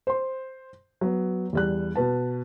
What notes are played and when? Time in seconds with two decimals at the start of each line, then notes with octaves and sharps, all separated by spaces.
0.07 C5 C6
1.01 F#3 B3
1.53 E2 G3 F#6
1.95 B2 B4 A5